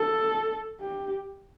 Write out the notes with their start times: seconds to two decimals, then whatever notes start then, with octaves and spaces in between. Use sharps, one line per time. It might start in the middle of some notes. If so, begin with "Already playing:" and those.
Already playing: A4
0.81 G4